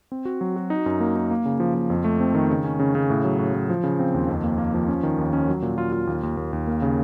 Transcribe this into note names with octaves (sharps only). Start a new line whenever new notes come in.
C4
F#4
F#3
F#4
D#4
F#2
A#3
D#4
A#3
C#3
F3
F3
F2
A3
C4
D#3
C#3
C#4
C#3
C#3
A2
F#3
A2
A2
F3
C#3
C4
D#2
F2
A#3
A#3
F3
C#4
D#3
D#2
C#4
F#3
A#2
F4
F4
D#2
D#2
D#2
D#2
A#3
C#3